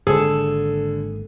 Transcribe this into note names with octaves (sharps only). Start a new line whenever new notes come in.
G#1 D3 G#3 A#3 G#4 A4